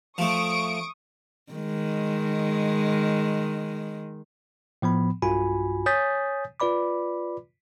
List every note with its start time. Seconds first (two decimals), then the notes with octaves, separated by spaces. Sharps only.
0.18 F3 A3 C#6 D#6 D7
1.52 D#3 G#3
4.82 A2 F3 B3 B5
5.22 B1 G2 F4 F#4 G#5 B5
5.86 C#5 G#5 D#6 G6 A6 B6
6.60 F4 B4 D5 B5 D6